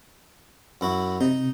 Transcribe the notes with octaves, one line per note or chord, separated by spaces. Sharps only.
F#2 E4 F#4
C3 D#4